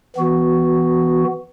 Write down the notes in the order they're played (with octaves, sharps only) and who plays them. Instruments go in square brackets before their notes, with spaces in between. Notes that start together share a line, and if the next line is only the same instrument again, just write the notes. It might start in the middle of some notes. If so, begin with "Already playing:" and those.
[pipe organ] E3 B3 F#4